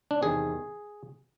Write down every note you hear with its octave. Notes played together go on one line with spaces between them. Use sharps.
D4
E2 C3 D#3 G#4